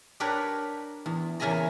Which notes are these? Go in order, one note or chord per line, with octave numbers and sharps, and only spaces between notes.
D4 G4 A#4 B4 C#5
E2
E2 C#3 A#3 E5 G#5 A#5